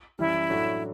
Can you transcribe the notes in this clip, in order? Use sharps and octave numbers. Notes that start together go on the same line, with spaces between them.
F#2 E3 G3 E4
A2 F#3 A3 D4 F#4